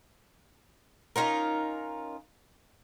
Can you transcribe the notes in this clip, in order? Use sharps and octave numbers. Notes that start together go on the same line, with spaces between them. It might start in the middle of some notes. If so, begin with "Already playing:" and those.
C#4 D#4 F4 A#4